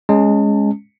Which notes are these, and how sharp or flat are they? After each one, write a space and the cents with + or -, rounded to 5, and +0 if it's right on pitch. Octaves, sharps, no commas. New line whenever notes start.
G#3 +0 C#4 +0 A5 +35